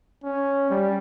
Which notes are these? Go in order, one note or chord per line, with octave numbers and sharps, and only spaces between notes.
C#4
G3